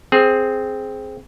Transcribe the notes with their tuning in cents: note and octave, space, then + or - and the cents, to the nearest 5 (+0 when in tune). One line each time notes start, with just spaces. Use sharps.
C4 +0 G#4 +10